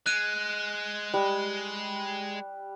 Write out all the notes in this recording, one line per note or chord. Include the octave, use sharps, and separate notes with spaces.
G#3 F#6 D#7
G3